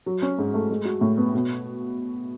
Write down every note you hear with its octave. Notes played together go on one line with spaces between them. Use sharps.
F#3
C#4
G#2
A3
G#3
F#4
A2
B3
B2